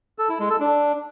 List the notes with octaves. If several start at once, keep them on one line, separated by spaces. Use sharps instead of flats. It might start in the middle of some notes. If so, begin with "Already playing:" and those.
A4
E4
G#3
A4
D4